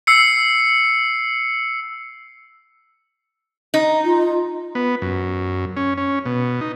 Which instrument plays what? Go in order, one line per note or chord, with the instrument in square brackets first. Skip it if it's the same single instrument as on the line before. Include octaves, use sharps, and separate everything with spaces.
[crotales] E6 C7 C#7
[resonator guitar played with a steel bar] D#4
[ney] F4
[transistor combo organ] B3
F#2
C#4
C#4
B2
D#4